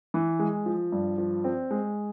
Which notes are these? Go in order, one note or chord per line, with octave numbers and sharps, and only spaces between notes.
E3
G#3
F3
G2
F3
C4
G#3